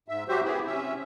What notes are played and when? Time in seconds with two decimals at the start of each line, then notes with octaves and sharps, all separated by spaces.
0.08 G#2 E5
0.28 F#3 F#4 G4 C5 E5
0.44 B3 E4 G4 G#4
0.66 C3 C#4 E5